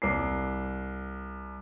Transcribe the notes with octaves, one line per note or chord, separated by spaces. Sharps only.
C2 D6 C7